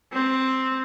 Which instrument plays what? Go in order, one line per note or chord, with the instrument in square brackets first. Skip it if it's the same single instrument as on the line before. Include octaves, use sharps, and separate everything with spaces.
[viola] C4